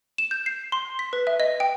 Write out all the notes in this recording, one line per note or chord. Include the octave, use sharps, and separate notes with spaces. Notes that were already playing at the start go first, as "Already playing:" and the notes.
E7
G6
C7
C6
B6
B4
E5
D#5
G5